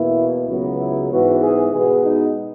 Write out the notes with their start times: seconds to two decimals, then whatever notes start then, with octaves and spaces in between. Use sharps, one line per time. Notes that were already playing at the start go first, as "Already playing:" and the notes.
Already playing: E2 B2 A#3 E4
0.48 C#2 C#3 F#3 B3 F#4
0.79 E4
1.10 G#2 E3 B3 F#4
1.41 G#4
1.72 B2 G#3 B3 G#4
2.02 D#4